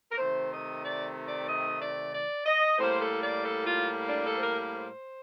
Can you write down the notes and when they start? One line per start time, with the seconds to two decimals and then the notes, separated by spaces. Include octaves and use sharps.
0.12 A#4
0.18 C3 D#3 A3 C5
0.51 D#5
0.84 D5
1.27 D5
1.49 D#5
1.81 D5
2.14 D5
2.46 D#5
2.78 A2 G3 A#3 C5
3.01 A4
3.23 D5
3.44 A4
3.66 F4
4.09 D4
4.25 A4
4.38 C5
4.42 A#4
4.75 C5